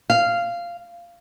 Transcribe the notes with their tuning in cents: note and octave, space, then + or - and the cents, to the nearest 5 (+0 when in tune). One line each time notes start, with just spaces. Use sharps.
F5 -10